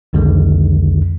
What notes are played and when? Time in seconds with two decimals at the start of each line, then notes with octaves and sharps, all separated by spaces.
0.13 C2 F2 D3 D#3 G#3